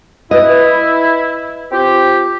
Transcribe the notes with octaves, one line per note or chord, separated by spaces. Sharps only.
E4 B4 D#5
C4 F4 G4